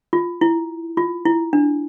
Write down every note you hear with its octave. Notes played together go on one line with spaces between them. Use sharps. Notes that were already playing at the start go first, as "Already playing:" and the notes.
F4
E4
F4
E4
D4